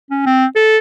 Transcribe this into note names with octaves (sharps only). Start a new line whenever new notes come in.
C#4
C4
A4